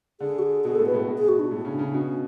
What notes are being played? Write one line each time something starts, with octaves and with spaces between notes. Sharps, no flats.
D3 G#4
F#4
G#4
B2 G#4
A2 A4
B4
A2 G#4
B2
G#4
F#4
D4
A2
C#3
C#3
B2 C#4